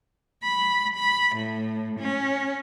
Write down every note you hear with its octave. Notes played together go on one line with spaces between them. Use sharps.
B5
B5
A2
C#4